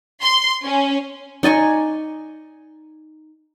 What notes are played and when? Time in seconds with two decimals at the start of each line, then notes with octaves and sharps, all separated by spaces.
0.24 C6
0.64 C#4
1.43 D#4 D5 G#5 C#6